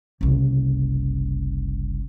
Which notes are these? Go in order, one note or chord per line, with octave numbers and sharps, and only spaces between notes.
F#1 C2